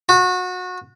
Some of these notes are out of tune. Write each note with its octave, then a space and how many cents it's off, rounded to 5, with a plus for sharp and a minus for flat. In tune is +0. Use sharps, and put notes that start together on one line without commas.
F#4 -25